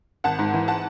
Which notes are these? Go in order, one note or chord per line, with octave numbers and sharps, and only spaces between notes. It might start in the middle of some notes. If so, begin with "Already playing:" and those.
G#1 F#5 A5
G#2
E3
F#5 A5